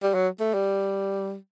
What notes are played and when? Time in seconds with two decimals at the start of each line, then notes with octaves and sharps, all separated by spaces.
0.03 G3
0.14 F#3
0.40 A3
0.54 G3